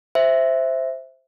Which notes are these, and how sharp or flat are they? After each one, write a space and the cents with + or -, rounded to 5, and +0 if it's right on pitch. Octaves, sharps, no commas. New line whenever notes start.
C5 +0 E5 +0